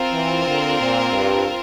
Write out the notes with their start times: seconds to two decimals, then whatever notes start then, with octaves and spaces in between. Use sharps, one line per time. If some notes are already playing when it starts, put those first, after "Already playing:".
Already playing: C4 F4 A#4
0.12 E3
0.46 D3
0.79 A#2
1.12 G2